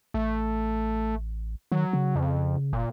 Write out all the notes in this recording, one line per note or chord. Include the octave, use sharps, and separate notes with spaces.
A1 A3
D#3 F#3
C#3
F2
F#1 A#2